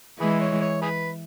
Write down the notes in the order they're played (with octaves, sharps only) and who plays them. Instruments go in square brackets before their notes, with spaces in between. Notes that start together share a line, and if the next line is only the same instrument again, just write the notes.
[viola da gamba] E3 G#3 [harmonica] G#4 B4
[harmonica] C#5
C#5
G#4 B4